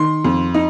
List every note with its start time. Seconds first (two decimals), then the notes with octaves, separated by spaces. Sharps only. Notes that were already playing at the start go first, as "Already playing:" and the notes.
Already playing: D#3 C6
0.25 F2
0.54 D#4